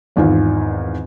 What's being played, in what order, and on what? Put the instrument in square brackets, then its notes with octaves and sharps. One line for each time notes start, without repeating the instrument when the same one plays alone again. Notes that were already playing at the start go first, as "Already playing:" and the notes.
[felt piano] G#1 E2 G#2 D#3 F4